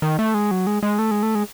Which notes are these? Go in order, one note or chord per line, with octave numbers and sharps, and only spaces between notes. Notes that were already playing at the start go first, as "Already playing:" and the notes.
D#3
A3
G#3
F#3
G#3
G#3
A3
G#3
A3
G#3